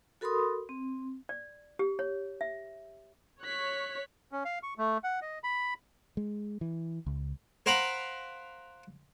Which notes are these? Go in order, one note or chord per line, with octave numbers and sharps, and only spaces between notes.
F#4 A4 A#4 B5 C6 D#6
C4
D5
G4
C#5
E5
C#5 F#6 B6
C#4
F5
C#6
A3
F#5
D#5
B5
G#3
E3
C#2
A#4 C5 F5 F#5 A#5 B5